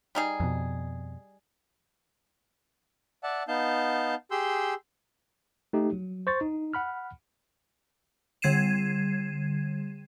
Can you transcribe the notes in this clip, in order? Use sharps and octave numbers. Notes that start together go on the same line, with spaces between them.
G3 D#4 G#4
F2 B2
D5 E5 F#5 A5
B3 D#4 F5 A5 G6
G4 G#4 C6 E6 G6
A3 D#4 G4
F#3
C5 C#6 A6
D#4
F#5 B5 F6
D3 G3 G#6 C7 D#7 E7